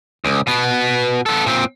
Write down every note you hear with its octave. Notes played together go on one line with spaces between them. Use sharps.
C#2
B2 B3
B3 A4
A#2 C4